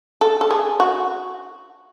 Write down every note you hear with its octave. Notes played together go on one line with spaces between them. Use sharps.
A4
A4
G#4
F#4